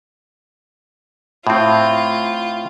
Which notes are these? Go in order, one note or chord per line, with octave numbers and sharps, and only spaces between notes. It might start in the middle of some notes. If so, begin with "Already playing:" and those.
A2 C4 F4